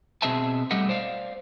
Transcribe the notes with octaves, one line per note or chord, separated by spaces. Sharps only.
B2 C4 G#4 D#5 E5 A5
G3 A3 G4 D#5 F#5
C5 D5 F5